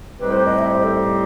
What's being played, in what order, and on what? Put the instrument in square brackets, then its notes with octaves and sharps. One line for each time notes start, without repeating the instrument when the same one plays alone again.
[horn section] A2 G3 C4 D#4 G4 [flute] B4
[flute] C5
D#5
E5
C5
A4